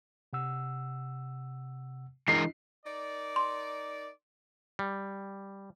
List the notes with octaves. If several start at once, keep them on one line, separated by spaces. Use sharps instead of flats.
C3 F#5 E6
E3 G#3 D4 E4 A#4 D#5 C7
D#4 A#4 D5
C6
G3